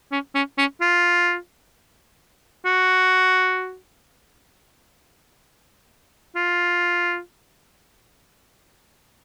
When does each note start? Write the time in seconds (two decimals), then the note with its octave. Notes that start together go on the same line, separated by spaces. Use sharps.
0.12 C#4
0.35 C#4
0.58 C#4
0.81 F4
2.66 F#4
6.36 F4